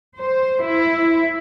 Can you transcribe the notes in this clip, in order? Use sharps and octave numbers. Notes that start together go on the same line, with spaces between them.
C5
E4